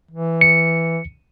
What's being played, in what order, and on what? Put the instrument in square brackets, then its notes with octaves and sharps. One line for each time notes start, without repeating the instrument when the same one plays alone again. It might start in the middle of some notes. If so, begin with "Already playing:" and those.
[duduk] E3
[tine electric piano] C#7